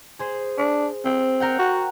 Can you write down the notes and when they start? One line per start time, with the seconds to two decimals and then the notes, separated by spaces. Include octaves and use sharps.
0.19 G#4 C5
0.58 D4
1.05 C4
1.40 A#4 F#5 G5
1.59 F#4